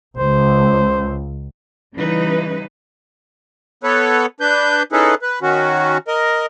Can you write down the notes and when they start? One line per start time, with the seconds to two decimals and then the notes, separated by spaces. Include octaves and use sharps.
0.18 C#2 C5
1.94 C#3 E3 G3 D#4 B4
3.84 B3 A4 B4 C#5
4.41 D4 B4 G6
4.92 C#4 D#4 E4 G#4 A4 B4
5.22 B4
5.42 D#3 C#4 F#4
6.08 A#4 D#5